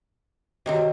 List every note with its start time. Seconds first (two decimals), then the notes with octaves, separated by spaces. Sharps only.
0.66 C3 D#3 C4 F#4 G4 C#5